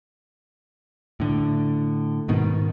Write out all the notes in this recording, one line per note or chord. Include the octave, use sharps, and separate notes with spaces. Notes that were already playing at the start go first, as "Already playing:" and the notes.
A2 D3
G#2 B2 D#3